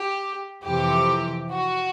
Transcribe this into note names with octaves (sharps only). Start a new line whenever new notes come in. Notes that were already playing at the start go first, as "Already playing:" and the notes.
Already playing: G4
F2 C3 E3 G4
F#4